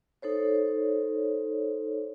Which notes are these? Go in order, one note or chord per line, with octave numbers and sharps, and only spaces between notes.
D#4 A4 C5 C#5